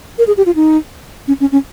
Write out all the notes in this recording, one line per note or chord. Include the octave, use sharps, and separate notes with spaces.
A#4
G#4
G4
F4
D#4
C#4
C#4
C#4